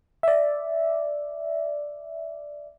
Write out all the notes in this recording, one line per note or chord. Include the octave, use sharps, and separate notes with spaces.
D5 E5